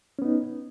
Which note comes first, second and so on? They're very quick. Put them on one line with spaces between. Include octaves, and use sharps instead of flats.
C#4 B3 D#4